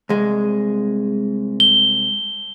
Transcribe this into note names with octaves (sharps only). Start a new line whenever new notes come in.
C2 G#3
G7